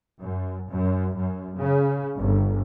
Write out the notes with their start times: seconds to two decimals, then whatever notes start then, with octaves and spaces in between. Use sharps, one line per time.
0.19 F#2
0.70 F#2
1.16 F#2
1.57 C#3
2.19 G1